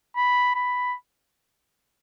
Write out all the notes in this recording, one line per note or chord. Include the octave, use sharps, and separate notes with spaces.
B5
B5